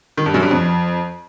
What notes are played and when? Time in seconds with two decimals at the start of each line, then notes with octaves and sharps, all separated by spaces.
0.17 D#3
0.26 G2
0.34 F#2
0.43 G2
0.51 F2